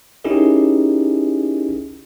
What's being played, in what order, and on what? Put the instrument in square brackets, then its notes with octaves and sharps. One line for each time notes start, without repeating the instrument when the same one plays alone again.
[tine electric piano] C#4 D#4 E4 G4 G#4 A#4